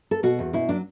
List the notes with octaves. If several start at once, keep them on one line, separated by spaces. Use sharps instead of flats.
A4
B2 F#4
E2
B2 E4
F#3 D4